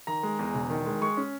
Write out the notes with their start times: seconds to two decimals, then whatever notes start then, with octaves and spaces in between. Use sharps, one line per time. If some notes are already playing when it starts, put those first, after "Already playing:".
0.07 D#3 A#5
0.23 G#3
0.39 E2
0.54 E1
0.70 D#3
0.86 G#3
1.02 G#3 C#6
1.17 C#4